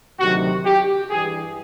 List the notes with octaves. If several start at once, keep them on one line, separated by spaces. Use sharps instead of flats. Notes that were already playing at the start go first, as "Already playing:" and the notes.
D2 C3 D#3 F#3 F#4
G4
G2 E3 G3 G#4